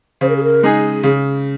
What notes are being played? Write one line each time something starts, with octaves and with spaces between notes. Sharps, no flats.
C#3 C5
A#4
G#4
A#4
G#3 D#4 G#4
C#3 G#4